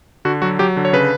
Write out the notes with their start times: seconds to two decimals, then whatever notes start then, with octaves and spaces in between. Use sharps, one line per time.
0.25 D3 F#4
0.42 F#3 F#4
0.59 F#3 G4
0.77 D3
0.85 C#5
0.93 C#3 B4